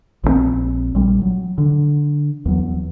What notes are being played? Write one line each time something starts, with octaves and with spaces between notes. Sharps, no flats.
A#1 C#3 C4
A#1 G3
F#3
D3
E2 F#3